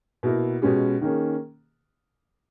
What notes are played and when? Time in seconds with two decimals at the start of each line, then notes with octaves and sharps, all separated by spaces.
0.23 B2 A#3 E4 A#4
0.62 B2 G#3 C#4 G4
1.01 D#3 A#3 C#4 G#4